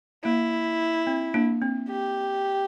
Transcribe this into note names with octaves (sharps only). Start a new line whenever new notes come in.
A#3 E4
C4
A#3 D4
C4
G4